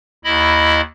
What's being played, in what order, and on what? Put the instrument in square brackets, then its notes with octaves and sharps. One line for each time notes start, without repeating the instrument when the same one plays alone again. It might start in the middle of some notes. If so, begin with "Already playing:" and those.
[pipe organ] D#2 E4 D#5 B5